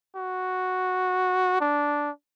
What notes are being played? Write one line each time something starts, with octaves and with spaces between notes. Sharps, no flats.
F#4
D4